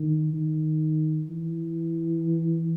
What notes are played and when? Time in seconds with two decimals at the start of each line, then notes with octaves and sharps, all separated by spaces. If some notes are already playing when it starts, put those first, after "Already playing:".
Already playing: D#3
0.33 D#3
1.30 E3